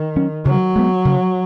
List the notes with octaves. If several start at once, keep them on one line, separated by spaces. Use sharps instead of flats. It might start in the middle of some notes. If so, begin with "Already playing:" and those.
Already playing: D#3
F#3 C#4
C#3 F#3
G#3 B3
C#3